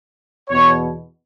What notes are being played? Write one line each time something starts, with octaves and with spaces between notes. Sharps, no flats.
E2 B2 C#5